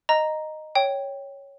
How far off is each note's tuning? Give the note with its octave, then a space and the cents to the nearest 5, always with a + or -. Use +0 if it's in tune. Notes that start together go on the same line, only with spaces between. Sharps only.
D#5 -5 A#5 +5
C#5 +0 G5 +0